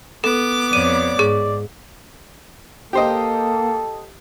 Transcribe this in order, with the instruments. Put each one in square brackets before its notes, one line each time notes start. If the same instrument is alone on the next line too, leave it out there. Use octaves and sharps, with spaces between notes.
[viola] B3 D6 [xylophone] A4
[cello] F2 C#5 [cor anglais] D5 [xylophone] D#7
[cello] G#2 [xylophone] G#4
[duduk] A#3 [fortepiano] G4 C5 D#5 [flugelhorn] A4